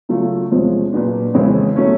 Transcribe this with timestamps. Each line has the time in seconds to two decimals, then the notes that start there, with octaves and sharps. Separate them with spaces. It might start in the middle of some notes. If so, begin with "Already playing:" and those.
0.09 C#3 F#3 A3 C#4 F4
0.51 E2 C3 F3 G#3 C#4
0.93 A#2 F#3 B3 D4
1.34 F2 C#3 E3 G#3 C4
1.76 B2 F#3 A3 C#4